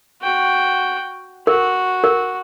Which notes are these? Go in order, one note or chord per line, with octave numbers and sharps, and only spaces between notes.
F#4 G5
F#4 A#4
A#4